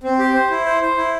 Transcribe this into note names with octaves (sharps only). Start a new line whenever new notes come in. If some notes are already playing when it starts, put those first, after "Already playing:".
C4
G4
C5
E4
C5
C5
E4